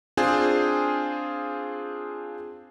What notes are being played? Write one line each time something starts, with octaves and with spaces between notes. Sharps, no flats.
C4 D4 F4 G#4 C5 G#5